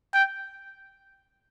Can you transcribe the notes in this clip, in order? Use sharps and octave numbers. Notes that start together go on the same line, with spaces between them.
G5